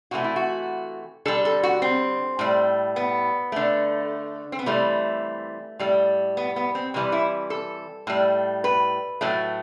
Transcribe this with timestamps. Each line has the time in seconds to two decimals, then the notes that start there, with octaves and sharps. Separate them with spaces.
0.11 C3 E3 A3 F#4
0.24 E4
0.36 F#4
1.25 D3 G3 A4
1.45 A4
1.63 F#4
1.82 C4
2.39 A2 G3
2.96 B3
3.52 D3 A3
4.52 C4
4.59 B3
4.66 C3 E3 G3 A3
5.79 A2 G3
6.37 B3
6.56 B3
6.75 C4
6.94 C3 E3 G3
7.12 E4
7.50 A4
8.07 A2 G3
8.64 B4
9.21 A2 F#3 A3